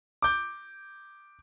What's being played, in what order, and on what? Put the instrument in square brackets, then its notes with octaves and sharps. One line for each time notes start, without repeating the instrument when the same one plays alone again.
[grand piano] D6 G6